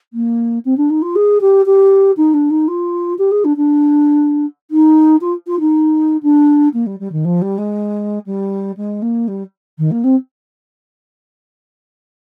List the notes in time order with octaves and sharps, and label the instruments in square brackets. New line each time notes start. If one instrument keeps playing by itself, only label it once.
[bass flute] A#3
C4
D4
D#4
F4
G#4
G4
G4
D#4
D4
D#4
F4
G4
G#4
D4
D4
D#4
F4
F4
D#4
D4
A#3
G3
G3
D#3
F3
G3
G#3
G3
G#3
A#3
G3
D#3
A#3
C4